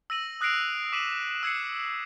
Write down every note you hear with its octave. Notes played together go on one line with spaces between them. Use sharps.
E6 A#6 D#7 F#7
D#6 F#6 A#6 C7 D7 F7
D6 B6 D#7 E7 F#7
E6 G#6 C7 C#7